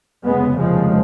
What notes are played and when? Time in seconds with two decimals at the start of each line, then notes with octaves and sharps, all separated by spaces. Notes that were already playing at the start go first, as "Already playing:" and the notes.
0.24 F1 D#2 C#3 G#3 B3
0.58 F3 G#3